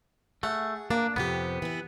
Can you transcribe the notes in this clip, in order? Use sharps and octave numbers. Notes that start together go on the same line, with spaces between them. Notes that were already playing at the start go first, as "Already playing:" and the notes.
A3 G#4 F#5
A#3 D4
F2 C3 B3 G4
E3 E4